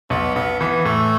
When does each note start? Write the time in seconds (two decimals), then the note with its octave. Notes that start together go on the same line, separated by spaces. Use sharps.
0.10 B1 B3
0.35 B1 B3
0.60 E3 B3
0.85 A2 A3